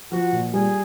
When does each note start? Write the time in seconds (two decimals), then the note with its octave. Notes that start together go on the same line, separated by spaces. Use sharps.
0.12 F3 F#4
0.32 A#2
0.54 G3 G#4